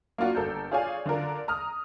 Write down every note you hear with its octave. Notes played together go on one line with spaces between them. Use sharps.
A#3 D4 F4 F#4
G1 A4 A#4 G6
F4 G#4 C#5 D5 F5 G#5
D3 D4 F4 A#4
A#5 D#6 F6